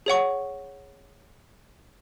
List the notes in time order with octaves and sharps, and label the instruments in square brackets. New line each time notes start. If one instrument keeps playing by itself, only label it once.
[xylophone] G#4 C#5 F#5 C#6